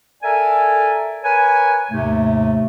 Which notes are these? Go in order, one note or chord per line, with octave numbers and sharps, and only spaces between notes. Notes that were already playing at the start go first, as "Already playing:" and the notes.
A4 A#4 D5 E5 G#5
A#4 B4 C#5 G#5
D#2 G#2 C3 A3